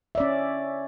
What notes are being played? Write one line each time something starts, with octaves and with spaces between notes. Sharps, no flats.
C#4 D5 E5